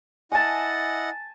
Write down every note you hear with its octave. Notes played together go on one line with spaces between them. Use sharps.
E4 D#5 F#5 G#5 A5